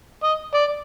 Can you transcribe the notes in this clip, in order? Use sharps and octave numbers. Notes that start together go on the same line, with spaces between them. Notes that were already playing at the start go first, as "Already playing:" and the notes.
D#5
D5